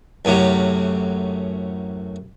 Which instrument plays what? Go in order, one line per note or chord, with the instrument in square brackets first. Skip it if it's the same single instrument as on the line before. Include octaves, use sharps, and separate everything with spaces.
[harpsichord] F#2 A2 C3 F#3